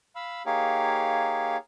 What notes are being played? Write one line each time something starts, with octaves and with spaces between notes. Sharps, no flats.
F5 B5 E6
A#3 D#4 G4 G#4 C#5 F5